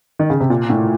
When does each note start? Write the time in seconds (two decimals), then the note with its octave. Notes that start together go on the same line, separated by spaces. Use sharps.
0.19 D#3
0.30 C#3
0.40 C3
0.50 A#2
0.70 A2